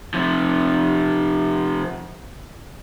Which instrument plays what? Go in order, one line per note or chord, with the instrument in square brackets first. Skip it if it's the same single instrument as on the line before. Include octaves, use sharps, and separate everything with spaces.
[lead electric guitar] C3 F3